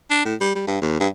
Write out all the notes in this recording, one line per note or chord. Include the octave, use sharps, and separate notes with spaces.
D4
A2
G3
G3
G2
D#2
G2